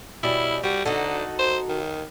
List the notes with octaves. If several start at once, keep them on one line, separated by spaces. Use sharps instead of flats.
B2 G3 C#4 E4
G3 F#4
D3 D#4 F#4 A4
C5
D#3